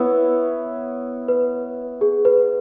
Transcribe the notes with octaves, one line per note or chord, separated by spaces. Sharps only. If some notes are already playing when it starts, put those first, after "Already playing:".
Already playing: B3 E4 B4 C#5 E5
B4
G#4
B4